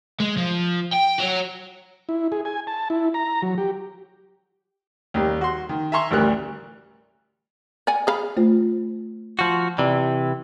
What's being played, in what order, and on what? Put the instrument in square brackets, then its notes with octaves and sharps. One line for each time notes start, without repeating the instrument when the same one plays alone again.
[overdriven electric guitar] G#3
F3
G5
F#4 C#5
[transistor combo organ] E4
G#4
G#5
A5
E4
A#5
F#3
G4
[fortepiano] D#2 G3 A#3
F#4 C6
D#3
E5 G#5 A#5 C6 C#6
A1 D2 G3 A#4 F#6
[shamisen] D5 F#5 G#5
G#4 F5 B5
[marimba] A3 F4 C5
[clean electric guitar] F3 F#4
[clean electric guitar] C3 E3 [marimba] D5